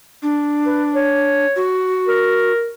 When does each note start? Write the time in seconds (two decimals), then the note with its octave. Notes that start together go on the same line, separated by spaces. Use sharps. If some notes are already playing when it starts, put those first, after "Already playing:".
0.22 D4
0.66 B4
0.95 C#5
1.56 F#4
2.08 A#4